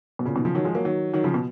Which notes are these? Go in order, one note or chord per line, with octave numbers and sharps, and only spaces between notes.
B2
A#2 C#3
B2 D#3
C#3 F3
D#3 F#3
F3 G#3
F#3 A#3
D#3 F#3
D#3 F#3
C#3 F3
B2